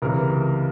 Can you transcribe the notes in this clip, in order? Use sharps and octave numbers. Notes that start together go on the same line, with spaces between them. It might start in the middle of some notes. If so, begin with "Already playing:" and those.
C#2 C3 E3 A#4